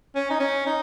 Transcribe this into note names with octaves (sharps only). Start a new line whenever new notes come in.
C#4
D#4
C#4
D#4